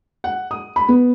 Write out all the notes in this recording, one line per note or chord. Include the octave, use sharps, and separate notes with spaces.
F#5
D#6
B5
B3